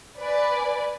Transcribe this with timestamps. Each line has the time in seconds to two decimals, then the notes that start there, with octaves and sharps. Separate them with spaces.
0.18 B4 D5 G#5